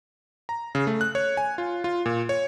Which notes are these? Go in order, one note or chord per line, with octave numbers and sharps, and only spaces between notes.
A#5
C#3
A3
F#6
C#5
G#5
F4
F4
A#2
C#5